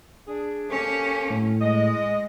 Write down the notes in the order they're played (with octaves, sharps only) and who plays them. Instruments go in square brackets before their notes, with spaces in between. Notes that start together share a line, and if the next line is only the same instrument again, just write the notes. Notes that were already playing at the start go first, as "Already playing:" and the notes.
[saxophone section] D4 G#4
[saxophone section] A#3 G4 A4 [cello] C#4
[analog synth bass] A2
[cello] G#3 [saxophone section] D#5